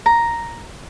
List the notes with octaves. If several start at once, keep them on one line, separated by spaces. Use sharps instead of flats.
A#5